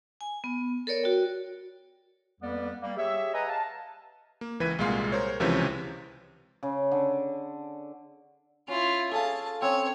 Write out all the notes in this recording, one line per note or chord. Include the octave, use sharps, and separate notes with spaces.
G#5
B3
A4 A#4 C#5 D5
F#4 G5
F2 G3 A#3 B3 B4 D5
G3 A#3
G4 G#4 C#5 E5
B4 D#5 F#5 G#5 A#5
F5 A5
A#3
C#2 E3 B4 G#6 B6 D#7
C2 A#2 G#3 F5 C6 C7
A#4 C5 C#5
C#2 C3 E3 F3 C#4 G6
C#3
D3
C#4 E4 F4
G#4 A4 F5 A5
C4 C#4 C#5 D#6